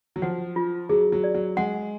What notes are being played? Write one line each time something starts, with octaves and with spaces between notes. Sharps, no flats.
F#3
F3 F#5
F4
F#3 G#4
F#3
D5
F#3
G#3 F#5